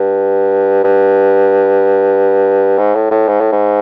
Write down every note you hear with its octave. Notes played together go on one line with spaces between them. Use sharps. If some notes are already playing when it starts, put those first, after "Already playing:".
Already playing: G2
G2
G#2
A2
A2
G#2
A2
G#2